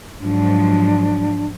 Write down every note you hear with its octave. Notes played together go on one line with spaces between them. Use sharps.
G#2 F3 F#3 D4